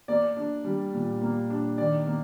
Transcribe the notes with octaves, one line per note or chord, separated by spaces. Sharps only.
A#3 D5
D4
G3
A#2
A#3
D4
D#3 D5
A#3